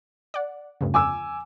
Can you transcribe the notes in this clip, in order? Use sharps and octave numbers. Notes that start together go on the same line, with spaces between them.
D5 F#5
D2 G2 C#3
F2 G#5 D6 E6